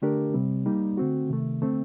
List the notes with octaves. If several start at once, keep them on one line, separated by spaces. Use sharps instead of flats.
D3 A3 D4 G4 A#4
C3 G3 C4
G3 A#3 D#4
D3 A3 C4 F#4
C3 D#3 A3
D3 A3 C4